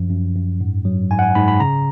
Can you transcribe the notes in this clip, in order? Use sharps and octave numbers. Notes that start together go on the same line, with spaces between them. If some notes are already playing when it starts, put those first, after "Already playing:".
Already playing: F#2 F3
F#2
F#2
G#2
F#3
G#2 G#5
F#5
G#5
G#2 B5
B5
C#3 A#5